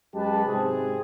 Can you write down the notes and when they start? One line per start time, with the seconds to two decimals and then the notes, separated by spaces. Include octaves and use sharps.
0.15 F#2 G#3 G4 B4 A5
0.47 G#2 C3 C4 G#4